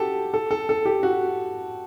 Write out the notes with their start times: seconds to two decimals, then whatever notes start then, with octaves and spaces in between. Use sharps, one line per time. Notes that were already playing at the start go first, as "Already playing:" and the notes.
Already playing: F#4 G4 A4
0.34 A4
0.51 A4
0.69 A4
0.85 G4
1.03 F#4